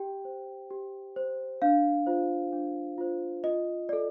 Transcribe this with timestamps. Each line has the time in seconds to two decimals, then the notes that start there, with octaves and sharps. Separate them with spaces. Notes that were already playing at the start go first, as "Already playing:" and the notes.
Already playing: G4 G5
0.25 C5
0.70 G4
1.16 C5
1.62 D4 F5
2.07 F4 C5
2.52 D4
2.98 F4 C5
3.44 F4 D#5
3.89 A4 D5